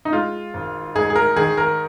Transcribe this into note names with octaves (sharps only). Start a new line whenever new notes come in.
D#4
G#3 F4
G#1
G#2 G#4
G#4
A#4
D#3 G#4
A#4